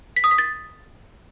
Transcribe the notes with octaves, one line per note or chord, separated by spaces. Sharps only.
B6
D#6
B6
A6